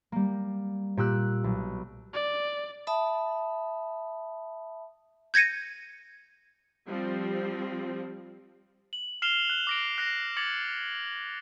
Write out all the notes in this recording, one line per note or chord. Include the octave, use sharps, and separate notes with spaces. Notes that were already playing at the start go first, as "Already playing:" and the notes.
G3 A#3
A#2 G4 E6 F#6
B1
D5
E5 A5 B5 D#6
G6 G#6 A#6 C#7 D#7
F3 G3 C4
F#7
F6 C7 E7 F7 G7
F#6
D6 A#6 D7
F#6 A#6 C7
D6 G#6 A6 C#7 F#7